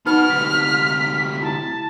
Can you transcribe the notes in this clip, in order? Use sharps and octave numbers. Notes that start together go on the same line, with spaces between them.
B3 D#4 F#4 B4 B5 F6
D2 C3 D#6 B6
E4 A5